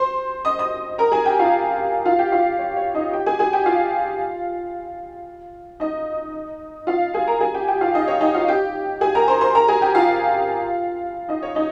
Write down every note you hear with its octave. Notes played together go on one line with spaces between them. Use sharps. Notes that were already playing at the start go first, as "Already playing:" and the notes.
Already playing: C5 C6
D#5 D#6
D#5 D#6
A#4 A#5
G#4 G#5
G4 G5
F4 F5
F4 F5
G4 G5
F4 F5
C#5
C#5
D#4 D#5
G4 G5
G#4 G#5
G#4 G#5
G4 G5
F4 F5
D#4 D#5
F4 F5
G#4 G#5
A#4 A#5
G#4 G#5
G4 G5
G4 G5
F4 F5
D#4 D#5
C#5
D#4 D#5
F4 F5
G4 G5
G#4 G#5
A#4 A#5
C5 C6
C5 C6
A#4 A#5
G#4 G#5
G4 G5
F4 F5
D#4 D#5
C#5
D#4 D#5